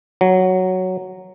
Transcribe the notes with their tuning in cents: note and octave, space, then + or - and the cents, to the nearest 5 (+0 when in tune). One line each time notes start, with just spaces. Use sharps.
F#3 +0